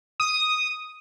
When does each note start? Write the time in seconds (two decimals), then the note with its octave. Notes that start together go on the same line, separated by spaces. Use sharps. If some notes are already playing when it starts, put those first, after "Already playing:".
0.20 D#6